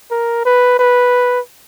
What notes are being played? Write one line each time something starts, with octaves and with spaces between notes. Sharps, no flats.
A#4
B4
B4